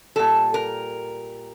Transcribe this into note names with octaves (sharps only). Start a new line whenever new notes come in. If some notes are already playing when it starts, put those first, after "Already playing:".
A#2 G3 A4
A#4